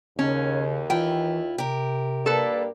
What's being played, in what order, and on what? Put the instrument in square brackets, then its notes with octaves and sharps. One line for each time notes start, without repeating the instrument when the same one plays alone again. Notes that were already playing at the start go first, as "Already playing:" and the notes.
[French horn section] D#2 [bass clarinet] C#3 [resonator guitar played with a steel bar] C#4
[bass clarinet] E3 [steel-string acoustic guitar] E4 F4 [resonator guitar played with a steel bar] G5
[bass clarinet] C3 [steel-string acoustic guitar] G4 A#4
[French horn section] G2 A#3 D5 [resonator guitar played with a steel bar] A4 B4